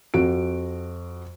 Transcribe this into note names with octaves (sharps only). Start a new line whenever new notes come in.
F2 F#4 D7